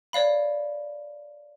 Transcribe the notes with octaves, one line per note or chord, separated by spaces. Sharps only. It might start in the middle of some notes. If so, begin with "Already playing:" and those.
C#5 D5 F5 B5